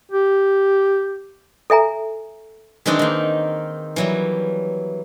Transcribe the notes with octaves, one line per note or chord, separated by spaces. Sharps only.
G4
A4 E5 G#5 A#5
D#3 E3 G#3 C4 D4 D#4
D#3 A#3
E3 F#3 G3